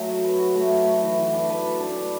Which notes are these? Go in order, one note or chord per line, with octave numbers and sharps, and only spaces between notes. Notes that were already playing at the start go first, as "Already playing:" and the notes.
Already playing: F#3 A3
F#4
B4
F#4
A3
F#4
F#4
E3
E3
D4
B4
D4
D4
D4